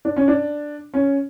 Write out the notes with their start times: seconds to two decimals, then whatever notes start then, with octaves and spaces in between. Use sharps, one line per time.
0.05 D4
0.16 C#4
0.28 D4
0.94 C#4